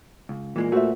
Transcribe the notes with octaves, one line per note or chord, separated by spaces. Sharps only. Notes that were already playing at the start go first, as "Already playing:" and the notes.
C#2
A#2 E3 G#3 A#3
A3 F#4 C5 E5